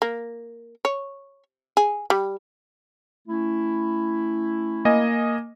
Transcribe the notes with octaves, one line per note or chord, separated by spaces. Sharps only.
A#3
C#5
G#4
G3
A3 C#4 E4
A#3 D#5 G#5